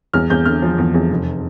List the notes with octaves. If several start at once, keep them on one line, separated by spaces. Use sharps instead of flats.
E2 F6
E2 G6
D3 F6
F3
E2
E2
F1